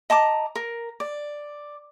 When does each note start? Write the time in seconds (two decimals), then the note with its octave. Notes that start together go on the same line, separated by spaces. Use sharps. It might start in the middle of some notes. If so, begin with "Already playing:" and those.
0.10 D#5 A5 A#5 D6
0.56 A#4
1.00 D5